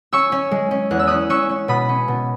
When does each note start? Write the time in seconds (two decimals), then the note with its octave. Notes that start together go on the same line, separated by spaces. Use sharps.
0.13 C#4 C#6 E6
0.32 C#4
0.51 G#3
0.71 C#4
0.91 E2 F#6
0.99 E6
1.07 C#4 D#6 F#6
1.30 C#4 C#6 E6
1.49 C#4
1.68 B2 B5 D#6
1.89 C#4
2.08 B2